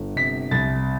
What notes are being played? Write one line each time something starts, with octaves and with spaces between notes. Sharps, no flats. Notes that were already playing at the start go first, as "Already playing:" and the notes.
Already playing: G1
C3 B6
C2 A6